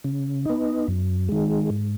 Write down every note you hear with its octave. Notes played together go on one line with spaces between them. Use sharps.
C#3
B3 D#4
F#2
D#3 G#3
G#2